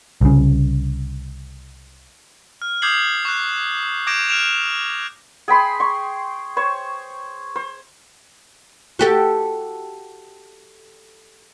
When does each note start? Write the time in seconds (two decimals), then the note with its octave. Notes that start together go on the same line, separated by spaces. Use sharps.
0.21 C2 C#3
2.62 F6
2.82 D6 D#6 G6 G#6 C7 F#7
3.25 C#6 F#6
4.07 D6 G6 G#6 A#6 D7 E7
4.29 F6 D7 E7 F7
5.48 G#4 G5 B5 C6
5.80 C6 C#6
6.57 C5 C#5 C#6
7.56 C5
8.99 F#4 G4 A4